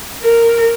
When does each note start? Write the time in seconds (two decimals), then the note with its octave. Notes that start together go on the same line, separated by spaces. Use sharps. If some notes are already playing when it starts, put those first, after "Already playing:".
0.22 A#4